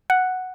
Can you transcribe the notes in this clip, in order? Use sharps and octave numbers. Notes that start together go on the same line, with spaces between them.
F#5